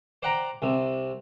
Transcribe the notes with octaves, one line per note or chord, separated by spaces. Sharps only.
C5 D5 F#5 G5 A#5
C2 C3